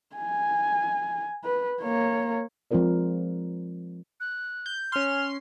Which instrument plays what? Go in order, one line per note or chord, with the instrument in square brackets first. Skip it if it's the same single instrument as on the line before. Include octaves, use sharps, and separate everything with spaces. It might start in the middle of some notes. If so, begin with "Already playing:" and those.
[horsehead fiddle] G#5
B4
A#3 C#5
[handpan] F3 G#3 C4 F4 A#4 D5
[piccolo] F#6
[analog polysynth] G6
[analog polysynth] C#4 C6 [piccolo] F6